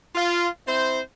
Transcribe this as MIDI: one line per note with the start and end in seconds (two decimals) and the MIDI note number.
0.15 0.48 65
0.67 0.99 60
0.67 0.99 64
0.67 0.99 72